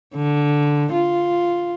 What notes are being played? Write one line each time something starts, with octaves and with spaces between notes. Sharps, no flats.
D3
F4